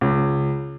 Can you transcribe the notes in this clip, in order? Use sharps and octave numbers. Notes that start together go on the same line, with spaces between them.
C#2